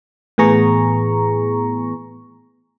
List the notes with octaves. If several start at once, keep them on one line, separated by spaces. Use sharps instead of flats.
A2 E3 B3 G#4 A#5 C#6